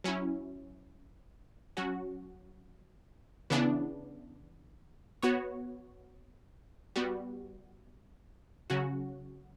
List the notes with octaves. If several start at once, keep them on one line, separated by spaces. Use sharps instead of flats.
F#3 C#4 E4
F#3 C#4 F#4
C#3 E3 B3 D4
B3 F#4 C#5
G3 B3 F#4
C#3 F#3 C#4 F#4